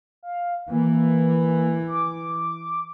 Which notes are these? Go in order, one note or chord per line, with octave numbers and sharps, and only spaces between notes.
F5
E3 A#3
D6